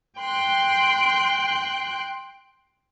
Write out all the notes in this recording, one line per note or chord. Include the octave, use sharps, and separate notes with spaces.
G5 C6 F#6 G6